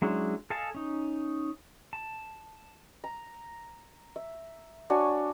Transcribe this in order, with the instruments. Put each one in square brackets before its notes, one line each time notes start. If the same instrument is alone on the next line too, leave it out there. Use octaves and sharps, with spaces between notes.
[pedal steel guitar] F#3 G#3 C#4 D4 E4
A4 D#5 F5 G#5 A5
C#4 D#4
A5
[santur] A#5
E5
D4 F#4 C#5 G#5